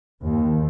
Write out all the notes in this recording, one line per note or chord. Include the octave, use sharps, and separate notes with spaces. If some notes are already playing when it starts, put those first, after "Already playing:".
D#2